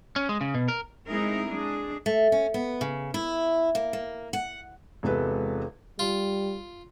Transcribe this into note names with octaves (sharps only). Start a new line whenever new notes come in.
C#4
G#3
C#3
B2
A#4
G#3 C4 D#4 E4 G#4 A#4
G#3 D4 G#4
A3
C#4
B3
C#3
E4
A#3
A#3
F#5
E1 C3 G#3 A4 B4
G3 F4